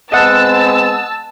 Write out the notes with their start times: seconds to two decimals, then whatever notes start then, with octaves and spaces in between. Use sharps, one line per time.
0.12 G#3 B3 C4 D#5 F#5 A5 E6